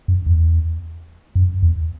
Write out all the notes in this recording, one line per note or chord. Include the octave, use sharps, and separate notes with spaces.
F#2
E2
F#2
E2